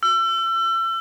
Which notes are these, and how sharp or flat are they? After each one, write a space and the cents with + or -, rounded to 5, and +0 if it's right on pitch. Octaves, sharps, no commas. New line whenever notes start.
E6 +35